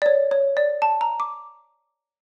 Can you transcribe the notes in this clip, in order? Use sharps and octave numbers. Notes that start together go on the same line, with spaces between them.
D5
C#5
C#5
D5
A5
A#5
D6